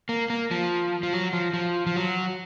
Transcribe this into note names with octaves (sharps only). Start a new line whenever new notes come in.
A#3
A#3
F3
F3
F#3
F3
F3
F3
F#3